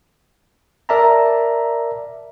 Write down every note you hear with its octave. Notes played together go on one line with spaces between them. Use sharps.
A#4 D5 E5 A5 A#5